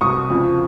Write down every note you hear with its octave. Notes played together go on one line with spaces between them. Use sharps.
C2 B2 C#6 D#6
F2 C#3 F3